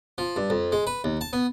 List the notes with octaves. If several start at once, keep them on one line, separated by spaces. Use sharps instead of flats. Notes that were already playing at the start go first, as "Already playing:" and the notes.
F3
G2
F2
G#3
B4
D#2
A5
B3